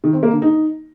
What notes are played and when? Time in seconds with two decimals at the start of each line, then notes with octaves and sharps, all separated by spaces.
0.04 D#3
0.13 C4
0.23 A#3
0.32 D3
0.42 D#4